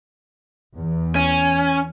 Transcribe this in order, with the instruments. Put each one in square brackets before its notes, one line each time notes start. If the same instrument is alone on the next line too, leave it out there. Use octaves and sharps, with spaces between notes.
[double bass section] E2
[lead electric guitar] C#4